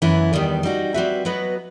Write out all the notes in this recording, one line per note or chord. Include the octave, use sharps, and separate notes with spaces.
F#2 E3 B3 E4
E2 D#3 G3 B3 D#4
G3 D#4 F#4
G3 C4 F#4 B4 E5
F#3 B3 F#4 B4 D#5